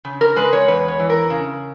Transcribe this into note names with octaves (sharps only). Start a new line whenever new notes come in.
C#3
A#4
G#3 B4
C#5
E2 B4
C#5
E3
A#4
C#3